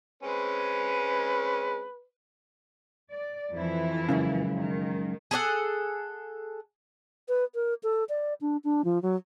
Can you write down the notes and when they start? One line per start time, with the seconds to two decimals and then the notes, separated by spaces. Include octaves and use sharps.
0.23 G#3 C4 C#4 B4
3.11 D5
3.53 F2 E3 E4
4.09 C#2 F#2 C#3
4.57 D#3
5.31 G#4 A4 D5 F#5
7.29 B4
7.55 A#4
7.83 A4
8.09 D5
8.41 D4
8.64 D4
8.84 F3
9.02 F#3